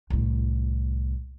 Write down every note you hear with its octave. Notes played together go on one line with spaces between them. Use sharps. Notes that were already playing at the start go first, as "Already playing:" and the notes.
C2 A2